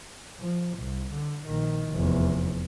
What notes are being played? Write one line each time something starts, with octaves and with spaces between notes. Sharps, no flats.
F3
C2
D3
A#1 D#3
F1 E2